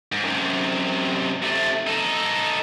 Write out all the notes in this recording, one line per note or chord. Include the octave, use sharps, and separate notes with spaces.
G#2
F#2 C3
C3 A3
D#4 A4